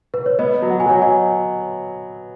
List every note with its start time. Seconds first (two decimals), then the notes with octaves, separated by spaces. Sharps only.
0.14 B4
0.26 C#5
0.39 B3 B4 D#5
0.62 F#3
0.70 F#5
0.80 G#5
0.86 F#3 C#5 F#5
1.02 D#5 G#5